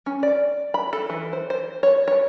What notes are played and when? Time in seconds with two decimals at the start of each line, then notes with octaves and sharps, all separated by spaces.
0.06 C#4
0.23 D5
0.74 B5
0.93 A4
1.10 E3
1.33 C5
1.50 C5
1.83 C#5
2.08 C#5